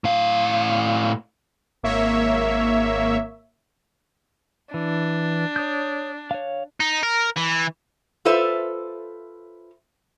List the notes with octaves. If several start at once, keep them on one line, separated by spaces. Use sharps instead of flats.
A2 F5
G#1 A#3 C#5 E5
E3 D4
C#5 D#6 G6
C#5 F5
D#4
A#4
E3
F4 A4 B4 C5 E5